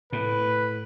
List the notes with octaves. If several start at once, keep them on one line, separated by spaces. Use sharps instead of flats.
A2 B4